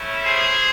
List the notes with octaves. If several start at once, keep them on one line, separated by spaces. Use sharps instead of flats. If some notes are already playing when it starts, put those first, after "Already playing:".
Already playing: A3 C#4 E4
G#4 C5